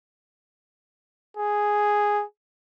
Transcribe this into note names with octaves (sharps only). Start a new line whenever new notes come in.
G#4